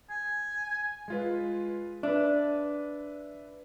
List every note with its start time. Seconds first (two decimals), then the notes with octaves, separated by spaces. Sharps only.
0.10 G#5
1.08 G#3 F4 B4
2.03 D4 B4 E5